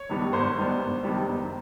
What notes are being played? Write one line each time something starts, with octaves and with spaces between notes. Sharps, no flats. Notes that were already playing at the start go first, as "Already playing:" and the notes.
Already playing: C#5
G2 D#3 G3 B3
G#1 C5
G2 D#3 G3 B3
G#1
G2 D#3 G3 B3
F#1